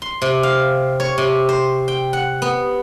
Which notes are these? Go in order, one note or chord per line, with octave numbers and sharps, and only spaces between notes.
C6
C3
F5
C#5
C3
C5
G5
F#5
B3